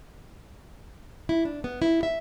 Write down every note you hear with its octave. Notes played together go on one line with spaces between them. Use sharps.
E4
D4
B3
E4
E5